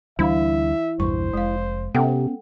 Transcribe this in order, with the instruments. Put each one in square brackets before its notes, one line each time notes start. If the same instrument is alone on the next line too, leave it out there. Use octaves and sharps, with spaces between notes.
[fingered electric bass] D2 G3 D4 [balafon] E3 F5 [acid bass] E4 [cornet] E5
[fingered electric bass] A#1 E2 G2 [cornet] C5 [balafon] C#6
[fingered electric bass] F1 [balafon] G#3 F5
[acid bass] C3 [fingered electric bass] B3 C#4 [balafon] A4 F#5 G5